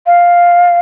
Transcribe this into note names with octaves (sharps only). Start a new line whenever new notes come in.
F5